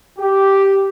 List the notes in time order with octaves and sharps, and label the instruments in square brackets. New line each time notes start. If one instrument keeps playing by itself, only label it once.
[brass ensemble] G4